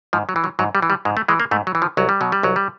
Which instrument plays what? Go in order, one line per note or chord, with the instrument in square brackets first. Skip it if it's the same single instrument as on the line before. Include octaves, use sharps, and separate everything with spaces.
[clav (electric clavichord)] G#2 F3
F#3
E3
F#3
G#2 F#3
G3
E3
G3
G#2 G#3
A3
E3 G#3
A#3
G#2 A3
F#3
E3
F3
C2 F#3
G3
B2 F#3
G3
C2 F#3
G3